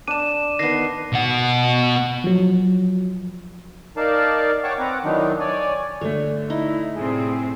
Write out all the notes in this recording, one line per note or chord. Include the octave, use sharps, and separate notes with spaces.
D4 D#7 E7
D#3 B3 A#6 C7
B2 F#5
F3 F#3
D#4 A#4 D5 F5 A5
C#5 F#5 G5 A5 C#6 D6
C4 B4 F#5 A#5 D6
D#3 E3 F#3 D4 D#4
C#5 D5 G#5
D3 A3 C#5
D#4 E4
A2 C3 C4 G#4